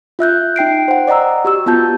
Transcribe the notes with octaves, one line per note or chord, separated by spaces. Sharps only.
F4 E5 F#6 G6
D#4 G5 C7 D7
C5 F#5
D5 D#5 F#5 A#5 E6
F#4 G4 E6
B3 F4 A5 G6